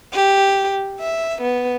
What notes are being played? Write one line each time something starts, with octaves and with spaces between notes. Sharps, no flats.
G4
E5
B3